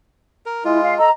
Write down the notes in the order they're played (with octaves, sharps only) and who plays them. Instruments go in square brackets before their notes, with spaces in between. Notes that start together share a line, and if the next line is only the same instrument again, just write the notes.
[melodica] A#4
[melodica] G#3 F4 [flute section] E4
[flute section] F5
[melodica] A4 [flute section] D#5 A#5